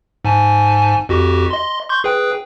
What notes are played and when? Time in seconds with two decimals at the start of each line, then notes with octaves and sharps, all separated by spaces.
0.25 G#2 G#5 A5
1.09 F2 F#4 G4
1.50 D#5 C6
1.89 C6 C#6 G6
2.04 G#4 B4 G5